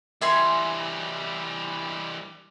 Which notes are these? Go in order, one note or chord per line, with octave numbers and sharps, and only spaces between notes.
E3 G3 E5 G#5 C6